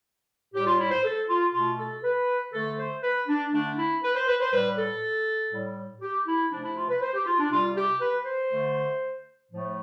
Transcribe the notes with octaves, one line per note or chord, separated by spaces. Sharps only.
A2 G3 G4
F4
E4
C5
A4
F4
B2 A3 F4
A4
B4
D3 A3 A4
C5
B4
D4
D3 A3 D4
E4
B4
C5
B4
C5
A2 G3 B4
A4
A2 G3
G4
E4
C3 F3 A3 D4
E4
F4
B4
C5
G4
F4
D4
C3 G3 F4
G4
B4
C5
D3 A3
A2 F3 A3